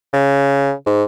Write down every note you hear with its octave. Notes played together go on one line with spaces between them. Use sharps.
C#3
G#2